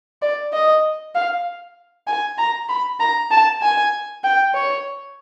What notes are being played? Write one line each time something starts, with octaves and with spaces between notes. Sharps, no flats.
D5
D#5
F5
G#5
A#5
B5
A#5
A5
G#5
G5
C#5